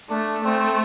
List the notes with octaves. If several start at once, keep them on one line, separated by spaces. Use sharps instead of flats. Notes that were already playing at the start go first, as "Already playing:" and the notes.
A3 D4
A3 C4